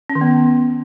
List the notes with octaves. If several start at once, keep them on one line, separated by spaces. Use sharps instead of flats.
C#4
D#3
B3